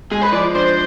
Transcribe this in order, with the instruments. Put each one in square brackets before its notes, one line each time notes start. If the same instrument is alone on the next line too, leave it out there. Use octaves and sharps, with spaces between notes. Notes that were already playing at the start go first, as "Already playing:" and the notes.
[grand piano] G#3 [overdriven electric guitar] G#4
[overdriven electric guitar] B4
[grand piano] F3 [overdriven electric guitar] D5
[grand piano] D4 [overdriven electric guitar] C5